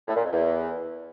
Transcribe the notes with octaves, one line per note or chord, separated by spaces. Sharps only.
A2
A#2
F2
E2